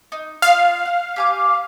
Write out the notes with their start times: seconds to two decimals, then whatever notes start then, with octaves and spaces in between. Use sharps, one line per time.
0.12 D#4
0.42 F4 D#5 F5 F6
0.86 F#5
1.16 G4 G#5 D6